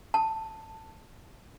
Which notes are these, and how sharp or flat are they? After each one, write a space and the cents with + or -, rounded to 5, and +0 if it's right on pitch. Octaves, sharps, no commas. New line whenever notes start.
A5 +10